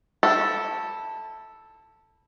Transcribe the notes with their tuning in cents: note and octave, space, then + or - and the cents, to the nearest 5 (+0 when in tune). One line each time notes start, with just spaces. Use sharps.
E4 -30 A4 +0